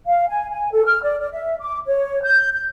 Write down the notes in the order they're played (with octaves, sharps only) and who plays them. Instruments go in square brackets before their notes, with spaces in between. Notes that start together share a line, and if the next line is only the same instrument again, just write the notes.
[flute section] F5
G#5
G#5
A4
F6
D5
D5
E5
D6
C#5
G6
G6